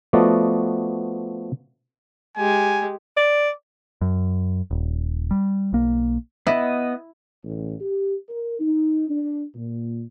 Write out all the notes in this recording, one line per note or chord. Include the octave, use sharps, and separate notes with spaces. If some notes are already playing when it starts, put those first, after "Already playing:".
F3 A3 B3 F#4 D5 D#5
G#3 G4 G#5
D5
F#2
D#1
G3
B1 A#3
B3 E4 D#5
A1
G4
A#4
D#4
D4
A#2